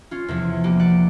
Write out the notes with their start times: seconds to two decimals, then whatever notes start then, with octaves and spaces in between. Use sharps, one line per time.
0.11 C#4 F4
0.28 E2 C3 F3
0.64 A#3 B3 G4
0.79 D5 F#5